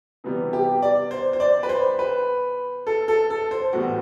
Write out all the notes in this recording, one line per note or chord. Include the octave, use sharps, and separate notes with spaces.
C3 E3 G3 B3
G4
D5
C5
C5
D5
B4
C5
B4
A4
A4
A4
C5
A2 E3 G3 B3 F#4